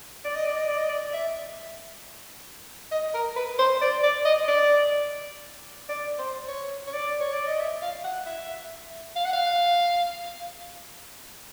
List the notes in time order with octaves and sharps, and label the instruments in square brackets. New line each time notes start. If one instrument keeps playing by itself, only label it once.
[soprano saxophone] D5
D#5
D5
D#5
D5
D#5
D5
E5
D#5
A#4
B4
C5
D5
D5
D#5
D5
D5
C5
C#5
C#5
D5
C#5
D5
D#5
E5
F5
F#5
E5
F5
F#5
F5